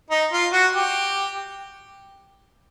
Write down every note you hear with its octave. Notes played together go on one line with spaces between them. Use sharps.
D#4
F4
F#4
G4